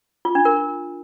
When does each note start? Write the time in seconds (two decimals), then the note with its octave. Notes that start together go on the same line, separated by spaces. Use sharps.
0.25 F4
0.35 D4
0.45 A#4